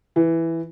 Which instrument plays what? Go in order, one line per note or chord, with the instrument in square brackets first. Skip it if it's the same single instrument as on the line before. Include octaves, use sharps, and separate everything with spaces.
[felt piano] E3